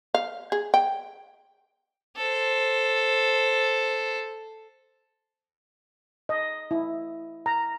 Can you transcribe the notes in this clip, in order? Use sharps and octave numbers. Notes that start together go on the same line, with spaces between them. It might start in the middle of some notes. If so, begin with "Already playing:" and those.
F5
G#4
G5
A4 C5
D#5
E4
A#5